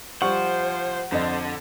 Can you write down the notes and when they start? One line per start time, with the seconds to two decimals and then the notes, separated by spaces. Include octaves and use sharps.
0.22 F3 G3 C5 F#5 C#6
1.12 F2 D3 C5 D#5